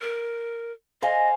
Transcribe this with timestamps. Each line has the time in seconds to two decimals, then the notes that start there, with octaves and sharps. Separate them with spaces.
0.01 A#4
1.02 C5 D#5 F5 G#5